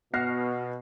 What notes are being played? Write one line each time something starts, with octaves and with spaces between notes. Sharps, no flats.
B2 B3 F#4 F6 A#6 C7